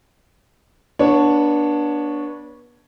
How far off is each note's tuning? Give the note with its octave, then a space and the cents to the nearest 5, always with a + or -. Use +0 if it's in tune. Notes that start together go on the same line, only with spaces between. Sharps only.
B3 -35 D4 +0 C#5 +0